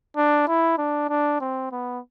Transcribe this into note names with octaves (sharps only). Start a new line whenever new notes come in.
D4
E4
D4
D4
C4
B3